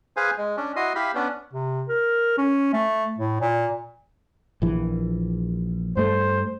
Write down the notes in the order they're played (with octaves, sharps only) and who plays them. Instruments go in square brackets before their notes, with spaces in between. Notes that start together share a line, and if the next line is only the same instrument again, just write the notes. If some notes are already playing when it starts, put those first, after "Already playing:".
[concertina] G#4 B4 C5 F5 G#5
G#3
C#4 D4
E4 F#4 D#5 C6 D#6
E4 G4 F5 B5
B3 C#4 D4
[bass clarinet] C3
A#4
C#4
A3
A2
A#2
[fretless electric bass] A#1 E3
[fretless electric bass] G2 A3 [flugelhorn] C5